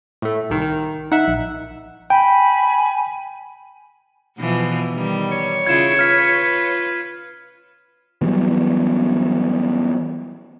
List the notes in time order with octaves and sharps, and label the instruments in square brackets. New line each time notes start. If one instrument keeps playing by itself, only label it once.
[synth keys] A2 A3
C2 D#3
D#3
[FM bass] D#4 [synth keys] E5 F#5
[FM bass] A#1
[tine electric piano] G5 [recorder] G#5 [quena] B5
[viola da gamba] B2 E3 F3
B2 D#3 G3
[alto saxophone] C#5
[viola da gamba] C#3 E4 F4 [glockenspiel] G#6 E7
[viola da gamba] F4 B4 [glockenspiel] F6 B6
[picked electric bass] E3 F#3 G3 B3